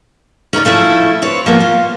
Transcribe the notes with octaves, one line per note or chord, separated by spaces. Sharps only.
C#4 D#4 A#4 D5
F3 A3 C#4 E4
C4 B4 C#5
F3 A#3 B3
F4